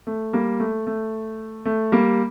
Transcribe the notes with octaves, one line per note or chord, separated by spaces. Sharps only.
A3
G3 A#3
A3
A3
A3
G3 A#3